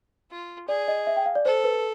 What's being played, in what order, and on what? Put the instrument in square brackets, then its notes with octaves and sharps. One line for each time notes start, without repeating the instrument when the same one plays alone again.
[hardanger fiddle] F4
[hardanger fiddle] G#4 [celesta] D5
[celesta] D#5
E5
G5
F5
D5
[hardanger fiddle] A4 [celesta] C5
[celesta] B4